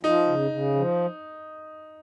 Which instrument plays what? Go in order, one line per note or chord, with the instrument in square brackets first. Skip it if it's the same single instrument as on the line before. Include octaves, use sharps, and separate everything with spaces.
[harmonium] F3 [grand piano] D#4
[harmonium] C#3
C#3
F3